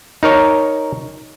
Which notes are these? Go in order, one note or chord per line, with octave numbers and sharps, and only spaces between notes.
D#4 A#4 C#5